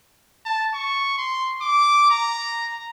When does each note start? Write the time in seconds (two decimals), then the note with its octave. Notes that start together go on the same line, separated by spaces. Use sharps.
0.45 A5
0.74 C#6
1.18 C6
1.61 D6
2.11 A#5